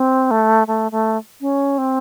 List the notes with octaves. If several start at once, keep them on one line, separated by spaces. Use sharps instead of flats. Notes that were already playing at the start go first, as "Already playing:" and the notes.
Already playing: C4
A3
A3
A3
C#4
C4